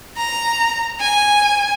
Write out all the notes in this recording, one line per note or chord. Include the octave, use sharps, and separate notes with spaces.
A#5
G#5